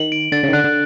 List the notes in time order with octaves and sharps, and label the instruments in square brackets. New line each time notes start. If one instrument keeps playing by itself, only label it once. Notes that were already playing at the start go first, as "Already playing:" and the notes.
Already playing: [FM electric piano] D#3 [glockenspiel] F#7
[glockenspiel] D7
[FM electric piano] D3 [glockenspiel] A6
[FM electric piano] C#3
D#3
[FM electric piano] D3 [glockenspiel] F#6
[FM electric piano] D3